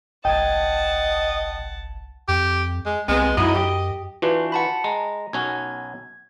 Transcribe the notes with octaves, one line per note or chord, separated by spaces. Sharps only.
G1 C2 D#5 F#5 G5 A5 G#6
F2 G4
G#3
C2 C3 G#3 B3
F#2 F#3 D#4 E4 D#5
G4
E3 D4 F4 F#4 B4
F#5 A5 B5
G#3 A#5
B1 C#4 F#4 G#6